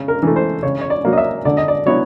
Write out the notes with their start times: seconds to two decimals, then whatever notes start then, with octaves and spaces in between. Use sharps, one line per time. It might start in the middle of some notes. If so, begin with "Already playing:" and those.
Already playing: C#3
0.08 A#4
0.23 E3 A3
0.36 C5
0.63 C#3 C#5
0.81 C#5
0.90 D5
1.05 F#3 A#3
1.13 D#5
1.18 E5
1.45 D3 D5
1.57 D#5
1.68 D5
1.86 F#3 B3 E4 C#5